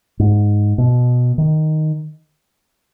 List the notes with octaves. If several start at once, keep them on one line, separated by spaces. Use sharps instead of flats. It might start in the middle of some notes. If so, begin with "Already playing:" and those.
G#2
B2
D#3